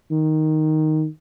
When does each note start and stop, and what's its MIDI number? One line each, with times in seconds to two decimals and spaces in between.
0.11 1.06 51